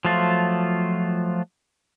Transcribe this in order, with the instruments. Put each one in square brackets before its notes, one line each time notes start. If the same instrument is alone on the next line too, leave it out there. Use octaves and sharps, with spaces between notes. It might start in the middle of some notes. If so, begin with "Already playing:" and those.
[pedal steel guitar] F3 F#3 A3 F4